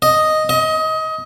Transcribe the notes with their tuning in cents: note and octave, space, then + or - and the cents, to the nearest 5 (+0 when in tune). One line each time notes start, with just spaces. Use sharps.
D#5 +0
D#5 +25